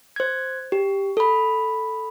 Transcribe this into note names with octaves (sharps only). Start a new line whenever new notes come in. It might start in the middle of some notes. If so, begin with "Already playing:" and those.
C5 G#6
G4
A4 B5